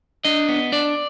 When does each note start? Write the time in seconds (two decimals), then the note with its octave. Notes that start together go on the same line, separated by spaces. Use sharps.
0.25 D4 D#5
0.49 B3
0.72 D4 D5